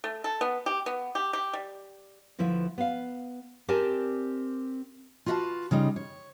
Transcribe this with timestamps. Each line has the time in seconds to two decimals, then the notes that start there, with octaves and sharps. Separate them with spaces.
0.04 A3
0.24 A4
0.41 B3
0.66 G4
0.86 B3
1.15 G4
1.33 G4
1.53 G3
2.39 D2 F3 E4 B4 E5
2.78 B3 F5
3.68 C4 G4 A#4 D5 G#5 A5
5.26 F4 F#4 B4 D#5 F5 A5
5.71 C#3 G3 D#4 F4
5.96 C#5